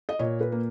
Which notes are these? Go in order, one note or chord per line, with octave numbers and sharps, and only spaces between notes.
D#5
A#2 C#5
B4
A#3